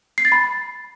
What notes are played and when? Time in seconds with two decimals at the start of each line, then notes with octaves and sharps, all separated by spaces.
0.18 C7
0.25 A6
0.32 B5